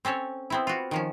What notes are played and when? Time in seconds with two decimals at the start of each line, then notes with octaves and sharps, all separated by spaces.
0.05 C4 C#4 A4 C#5
0.50 B3 C4 E4
0.67 F4 F#4
0.91 D#3 F3 C#4